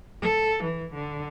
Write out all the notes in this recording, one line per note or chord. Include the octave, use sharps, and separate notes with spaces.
A4
E3
D3